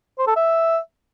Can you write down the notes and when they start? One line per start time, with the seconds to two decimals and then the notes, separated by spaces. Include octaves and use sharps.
0.18 C5
0.27 A4
0.36 E5